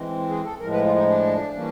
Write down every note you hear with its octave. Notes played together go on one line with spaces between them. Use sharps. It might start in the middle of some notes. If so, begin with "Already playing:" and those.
Already playing: E3 G#3 C4
G#4
A4
A2 F3 G#3 A#4
B4
F4
D#4
D4
E3 G3 A#3 C#4